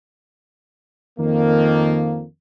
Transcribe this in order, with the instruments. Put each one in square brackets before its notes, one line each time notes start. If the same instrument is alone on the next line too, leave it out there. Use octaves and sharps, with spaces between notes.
[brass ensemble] F2 D#3 F3 A#3